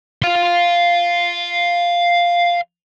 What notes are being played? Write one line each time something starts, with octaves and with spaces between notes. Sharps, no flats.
F5 C6